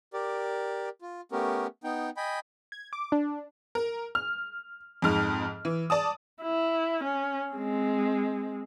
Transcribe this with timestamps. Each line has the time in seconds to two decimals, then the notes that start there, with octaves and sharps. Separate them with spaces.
0.13 G4 A#4 D5
1.02 F4
1.32 A3 B3 C#4 G4 A#4
1.84 B3 D#4 G5
2.17 D#5 G5 G#5 B5
2.72 G#6
2.93 D6
3.12 D4
3.75 A#4
4.15 F6
5.02 F2 G#2 F6
5.65 E3
5.90 D5 A5 D#6
6.43 E4
7.04 C#4
7.53 G#3 C4